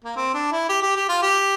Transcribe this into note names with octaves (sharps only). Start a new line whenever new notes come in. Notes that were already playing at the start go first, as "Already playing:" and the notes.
A#3
C4
D4
E4
G4
G4
G4
F4
G4